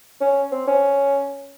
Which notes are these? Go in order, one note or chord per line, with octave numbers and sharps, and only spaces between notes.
C#4
C4
C#4